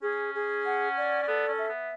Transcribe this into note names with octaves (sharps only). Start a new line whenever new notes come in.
C#4 G#4
G#4
F#5
D5
C#4
B3 A4
C#4
E5
B3